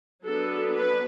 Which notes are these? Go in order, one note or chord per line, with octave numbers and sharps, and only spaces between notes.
F#3 B3 D4 A4
B4